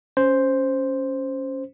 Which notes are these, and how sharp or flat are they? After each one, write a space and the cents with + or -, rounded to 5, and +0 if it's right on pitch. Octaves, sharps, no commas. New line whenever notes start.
C#4 +0 C5 +0